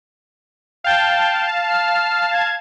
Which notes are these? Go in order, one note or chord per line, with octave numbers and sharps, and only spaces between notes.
F5 G5 A5
F6
G#6